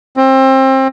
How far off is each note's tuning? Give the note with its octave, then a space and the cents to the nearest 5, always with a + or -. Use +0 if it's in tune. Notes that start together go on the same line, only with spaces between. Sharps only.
C4 +25